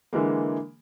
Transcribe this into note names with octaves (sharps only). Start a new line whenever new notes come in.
D3 E3 G#3 A#3